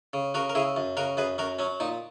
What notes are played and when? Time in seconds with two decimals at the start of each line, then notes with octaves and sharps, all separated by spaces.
0.13 C#3
0.34 C#3 F#4 A#4
0.49 A#4
0.55 C#3 E4 G#4
0.77 F#2
0.97 C#3 F#4 A#4
1.17 F#2 G#4 B4
1.38 F#2 F#4 A#4
1.59 F#3 C#4
1.80 A#2 D#4